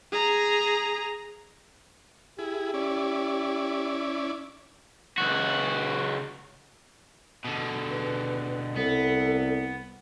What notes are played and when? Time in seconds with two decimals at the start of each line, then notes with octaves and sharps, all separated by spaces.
0.12 G#4 A#5
2.39 E4 G4 G#4
2.74 C#4 E4 D5
5.18 C#2 F#4
7.45 B2 D3
7.90 B4
8.76 C2 B3 A4